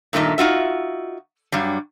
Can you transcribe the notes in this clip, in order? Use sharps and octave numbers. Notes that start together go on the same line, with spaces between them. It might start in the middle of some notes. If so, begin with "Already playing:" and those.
G2 A#2 D#3 A3 D#4
D#4 F4 F#4 E5
G2 F#3 G3